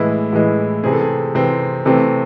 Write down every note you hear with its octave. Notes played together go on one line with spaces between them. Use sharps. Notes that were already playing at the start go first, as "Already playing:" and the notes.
Already playing: A2 E3 G#3 E4
A2 E3 G#3
C3 E3 C4 G#4
A4
G#4
C3 E3 C4
C3 E3 A3 C4 A4